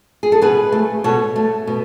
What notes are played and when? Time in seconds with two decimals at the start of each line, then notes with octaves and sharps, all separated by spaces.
0.23 G#4
0.32 A4
0.42 B2 G#4 B4
0.72 A3
1.04 B2 A4 C#5
1.36 A3
1.67 B2